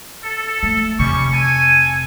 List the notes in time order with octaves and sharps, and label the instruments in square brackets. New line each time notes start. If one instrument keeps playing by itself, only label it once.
[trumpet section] A4
[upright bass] A3
[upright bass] F1 C3 [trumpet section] G3 C#4 C#6
[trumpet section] A4 G#5